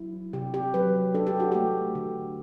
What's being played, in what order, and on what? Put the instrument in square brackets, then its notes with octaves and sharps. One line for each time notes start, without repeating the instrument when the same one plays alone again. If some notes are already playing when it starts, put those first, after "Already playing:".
Already playing: [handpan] F#3 E4
C3 G4
G4
F#3 B4
D4 A4
G4
F#4
A3 G4
D3